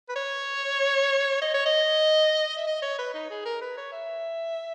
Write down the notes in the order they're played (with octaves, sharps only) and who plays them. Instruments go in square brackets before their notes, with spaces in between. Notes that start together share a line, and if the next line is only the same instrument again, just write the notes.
[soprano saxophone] B4
C#5
D#5
C#5
D#5
E5
D#5
C#5
B4
D#4
G#4
A#4
B4
C#5
E5